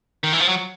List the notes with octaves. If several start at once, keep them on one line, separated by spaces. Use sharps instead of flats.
D#3
E3
F3
F#3